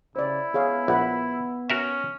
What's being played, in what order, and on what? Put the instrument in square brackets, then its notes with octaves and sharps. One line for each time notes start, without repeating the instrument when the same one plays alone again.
[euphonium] C#3 [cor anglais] E4 [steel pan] C5 D5
[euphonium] B3 [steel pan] G#4 C#5 F5
[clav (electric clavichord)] A#1 [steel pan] E5 F#5 B5
[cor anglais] C#4 [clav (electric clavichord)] F#4 A#4 E5